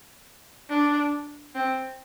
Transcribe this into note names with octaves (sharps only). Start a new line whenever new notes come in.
D4
C4